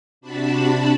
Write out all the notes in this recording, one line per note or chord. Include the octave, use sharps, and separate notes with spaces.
C3 D4 F#4 A5 B5